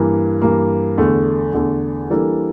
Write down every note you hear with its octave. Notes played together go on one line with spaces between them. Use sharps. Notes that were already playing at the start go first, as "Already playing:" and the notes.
Already playing: G2 E3 A#3
G2 E3 A#3
E2 D3 A3
E2 D3 A3
E3 G3 A#3 D4 A4